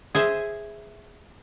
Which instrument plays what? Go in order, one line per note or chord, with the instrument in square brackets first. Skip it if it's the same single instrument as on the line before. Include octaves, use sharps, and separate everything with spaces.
[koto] G#4 C5 E5